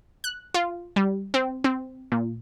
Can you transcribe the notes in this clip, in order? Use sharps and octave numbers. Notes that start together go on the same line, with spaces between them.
F#6
F4
G3
C4
C4
A#2